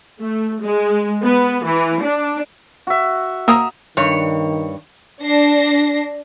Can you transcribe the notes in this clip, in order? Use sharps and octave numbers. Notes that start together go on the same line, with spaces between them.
A3
G#3
B3
E3
D4
F#4 E5
A#3 A#5 D#6 E6
G2 D#3 C#5
D4 A#6 C7